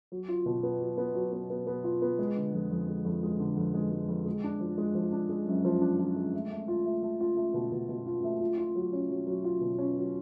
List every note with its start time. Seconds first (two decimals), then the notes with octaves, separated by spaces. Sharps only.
0.12 F#3
0.28 F4
0.46 B2
0.63 B3
0.81 F#3
0.97 B3
1.15 F#3
1.33 B3
1.50 B3
1.67 B3
1.84 F4
2.02 B3
2.19 G#3
2.36 D3
2.53 F2
2.71 F2
2.88 G#3
3.05 F2
3.23 G#3
3.39 D3
3.57 F2
3.74 G#3
3.92 G#3
4.08 F2
4.26 G#3
4.44 D4
4.60 F3
4.78 G#3
4.95 F3
5.12 D4
5.29 G#3
5.47 F#2
5.65 F3
5.81 D4
5.99 F3
6.16 G#3
6.34 A3
6.51 A3
6.68 F4
6.85 A3
7.03 A3
7.20 F4
7.37 A3
7.54 B2
7.72 B2
7.89 B2
8.06 F4
8.24 A3
8.40 F4
8.58 F4
8.75 F#3
8.93 C#4
9.10 F#3
9.27 F#3
9.44 F4
9.61 B2
9.78 C#4
9.96 F#3